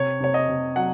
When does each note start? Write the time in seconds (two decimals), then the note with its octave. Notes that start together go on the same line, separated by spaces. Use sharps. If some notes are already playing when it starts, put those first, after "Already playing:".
Already playing: C3 C#5
0.20 C3 C#5
0.34 D#5
0.49 C3
0.76 F#3 F#5